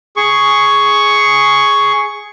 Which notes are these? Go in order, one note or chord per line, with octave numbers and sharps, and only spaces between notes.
G#4 C#6